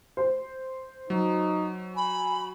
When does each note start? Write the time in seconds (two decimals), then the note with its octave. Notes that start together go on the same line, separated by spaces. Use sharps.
0.17 C5
1.10 F#3 D#4
1.97 G#5 B5